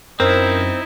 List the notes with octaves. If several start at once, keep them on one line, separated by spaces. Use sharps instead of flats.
F#2 C4 D#4 E4 A#4 C5